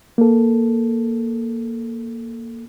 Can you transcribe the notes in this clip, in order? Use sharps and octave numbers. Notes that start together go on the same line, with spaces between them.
A#3 A4